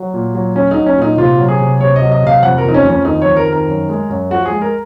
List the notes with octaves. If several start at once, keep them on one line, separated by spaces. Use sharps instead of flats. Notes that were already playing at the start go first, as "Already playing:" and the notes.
Already playing: F#3
A#2
F#3
F#3 C#4
F#3 D#4
C#4
A#2
D#4
C3 F4
F#3
G#4
C3
C3 C#5
D#5
F#3
D#5
C3 F5
F2 F#5
A#4
F2 D#4
C#4
F2 C#4
D#3 D#4
F2 C#5
A#4
D#3
A#4
F#2
G#3
F#2
F3 F#4
G#4
G#3
A#4